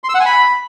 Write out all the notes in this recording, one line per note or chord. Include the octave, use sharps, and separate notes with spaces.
C6
E6
F#5
G#5
B5